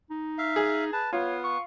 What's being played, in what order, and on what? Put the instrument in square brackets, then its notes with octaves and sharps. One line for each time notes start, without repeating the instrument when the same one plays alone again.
[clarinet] D#4
[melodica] E5 F5
[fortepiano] G#4
[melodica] B4 [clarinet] A5
[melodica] B3 [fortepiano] F4 [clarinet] C#5
[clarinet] C#6